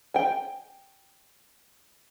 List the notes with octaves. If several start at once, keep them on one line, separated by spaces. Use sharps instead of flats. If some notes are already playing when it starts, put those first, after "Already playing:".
G5 G#5